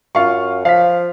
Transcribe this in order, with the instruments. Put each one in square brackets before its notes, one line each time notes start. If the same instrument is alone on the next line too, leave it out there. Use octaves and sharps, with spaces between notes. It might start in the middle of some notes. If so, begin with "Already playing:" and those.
[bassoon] F#2 [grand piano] F4 F5 C#6
[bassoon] F3 [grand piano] F5 B6